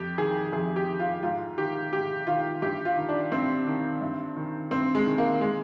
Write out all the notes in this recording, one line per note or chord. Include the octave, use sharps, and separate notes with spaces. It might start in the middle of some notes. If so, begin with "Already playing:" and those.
Already playing: F2 G4
D#3 G#4
F2 G#4
G4
D#3
F4
G#2 F4
D#3 G4
G#2 G4
D#3 F4
G2 G4
F4
D#3
D4
G2 C4
D#3
G2
D#3
G2 C4
G#3
D#3
A#3
G#3